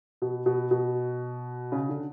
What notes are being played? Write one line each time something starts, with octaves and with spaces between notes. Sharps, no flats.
B2
B2
B2
C#3
D3